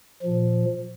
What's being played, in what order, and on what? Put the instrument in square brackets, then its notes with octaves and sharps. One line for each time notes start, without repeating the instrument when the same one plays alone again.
[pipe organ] A#2 F3